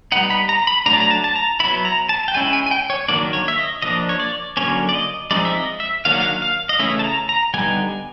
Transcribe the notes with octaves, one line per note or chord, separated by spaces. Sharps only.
G3 B3 D#4 F#5
B5
A#5
B5
F#3 A3 D4 A#5
A5
A#5
A5
A5
A#5
F#3 B3 E4 B5
A#5
A5
G5
G#3 C#4 E4 G#5
G#5
G#5
G5
C#5
D#3 F#3 A#3 D4 D5
C#5
E5
D#5
F3 A#3 D4 D#5
C#5
D5
D3 F#3 A#3 C#4 C#5
D5
D#5
F3 G#3 C4 D#4 D5
E5
D#5
E5
D#3 F#3 A#3 D4 F5
F#5
F5
F5
D#5
C#3 E3 A3 C#4 E4 E5
A5
A#5
A#5
D3 G3 B3 D#4 G#5